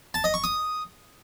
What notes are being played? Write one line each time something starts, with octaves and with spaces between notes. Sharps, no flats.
A5
D#5
C#6
D#6